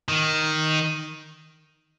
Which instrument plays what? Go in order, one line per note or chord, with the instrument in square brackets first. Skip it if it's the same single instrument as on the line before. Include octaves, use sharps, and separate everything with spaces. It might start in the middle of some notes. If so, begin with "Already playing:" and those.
[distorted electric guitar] D#3